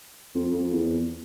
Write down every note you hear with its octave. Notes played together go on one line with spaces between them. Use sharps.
F2
F2
E2